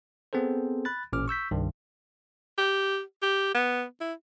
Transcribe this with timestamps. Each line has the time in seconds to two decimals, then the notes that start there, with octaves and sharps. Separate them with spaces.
0.33 B3 C4 G#4 A4 C5
0.85 B5 F#6 A6
1.13 A1 A#2 C#4 D6 F6
1.28 C#6 E6 G6 B6
1.51 C2 G2 D#3
2.58 G4
3.22 G4
3.54 B3
4.01 E4